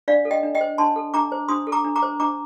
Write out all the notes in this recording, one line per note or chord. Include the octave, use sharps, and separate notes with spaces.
D4 D5 F5
A4
D#5 G5
D4
D#5 G5
C5
D4 A5 C6
A4
D4 A#5 D6
C5
D4 C6 D#6
A4
A#5 D6
D4
A#5 D6
C5
D4 A#5 D6